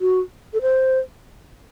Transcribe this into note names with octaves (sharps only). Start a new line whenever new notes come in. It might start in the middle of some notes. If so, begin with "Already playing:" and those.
F#4
A4
C5